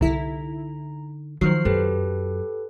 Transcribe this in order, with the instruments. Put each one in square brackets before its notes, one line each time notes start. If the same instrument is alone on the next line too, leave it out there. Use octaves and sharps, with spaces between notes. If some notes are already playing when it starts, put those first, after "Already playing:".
[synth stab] C2 E4 [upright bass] D3 D#4 [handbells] A#5
[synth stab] D#3 F#3 [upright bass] F3 [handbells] C5 F6 C7
[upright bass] F#2 [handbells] G4 A4 B4